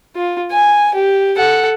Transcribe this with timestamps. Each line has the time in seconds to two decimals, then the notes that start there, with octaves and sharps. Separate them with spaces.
0.15 F4
0.52 G#5
0.94 G4
1.37 A4 F#5